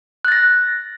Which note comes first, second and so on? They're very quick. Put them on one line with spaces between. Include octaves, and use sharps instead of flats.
F#6 A6 A#6